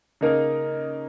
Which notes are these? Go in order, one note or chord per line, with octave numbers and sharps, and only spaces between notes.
C#3 A#3 D#4 A#4